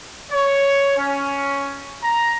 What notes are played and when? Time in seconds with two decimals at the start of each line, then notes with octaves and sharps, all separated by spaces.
0.31 C#5
0.97 C#4
2.04 A#5